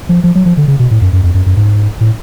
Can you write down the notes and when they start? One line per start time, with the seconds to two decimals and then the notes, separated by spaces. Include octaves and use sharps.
0.09 F3
0.24 F3
0.35 F#3
0.45 F3
0.57 D3
0.68 C#3
0.79 B2
0.91 A2
1.02 F#2
1.13 F#2
1.23 F2
1.34 F#2
1.46 F#2
1.57 G#2
2.01 A2